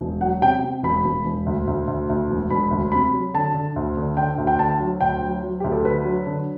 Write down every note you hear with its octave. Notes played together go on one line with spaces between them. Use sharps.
E1
F#3 F#5
C3 G5
C3
E1 B5
E1
E1
D2
D2
D2
D2
E1
E1 B5
D2
C3 B5
F#3
D3 A5
D3
D2
D3
D3 G5
D2
G5
D3 A5
F#3
D2 G5
F#3
F#3
D2 G4
A4
D3 B4
F#3
D3